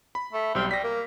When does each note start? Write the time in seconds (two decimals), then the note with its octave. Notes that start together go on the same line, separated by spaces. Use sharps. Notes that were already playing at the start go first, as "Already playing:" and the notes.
0.15 B5
0.33 A3
0.55 B1 G3 C4 F6
0.71 G3 A#6 B6
0.84 A#3